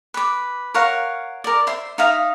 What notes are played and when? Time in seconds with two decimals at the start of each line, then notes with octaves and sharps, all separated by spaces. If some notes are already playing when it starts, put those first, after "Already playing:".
0.14 B4 D6
0.74 A#4 C#5 F5 F#5
1.44 A#4 D5
1.67 C5 E5 C6
1.98 D#4 E5 F5 D#6